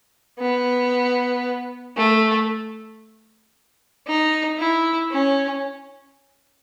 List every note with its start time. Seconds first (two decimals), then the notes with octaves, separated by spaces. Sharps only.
0.39 B3
1.97 A3
4.07 D#4
4.59 E4
5.11 C#4